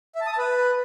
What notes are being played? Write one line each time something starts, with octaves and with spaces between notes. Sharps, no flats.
E5
A5
D#6
A5
B4